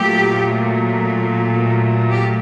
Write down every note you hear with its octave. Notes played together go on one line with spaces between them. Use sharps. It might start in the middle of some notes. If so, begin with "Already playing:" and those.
Already playing: A#2 F#3 A3 G4
G4